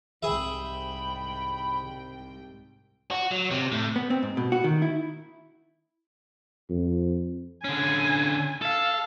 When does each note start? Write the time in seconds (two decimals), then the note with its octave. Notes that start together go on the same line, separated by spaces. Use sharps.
0.23 C2 G#2 G#4 E5 G5 B5
3.11 F#4
3.31 F#3
3.51 C3
3.72 A2
3.96 B3
4.10 C4
4.23 G#2
4.37 B2
4.52 F#4
4.64 D#3
4.82 E4
6.70 F2
7.64 D3 C#4 G#5
8.62 A4 F5